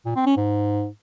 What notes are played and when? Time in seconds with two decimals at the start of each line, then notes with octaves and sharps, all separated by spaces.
0.06 A#2
0.16 C4
0.26 C#4
0.37 G#2